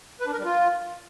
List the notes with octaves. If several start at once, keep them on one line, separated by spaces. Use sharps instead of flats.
B4
D4
A#4
G3
F4